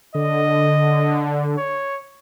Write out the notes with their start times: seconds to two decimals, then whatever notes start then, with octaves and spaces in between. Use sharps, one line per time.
0.15 D3 D#5
1.57 C#5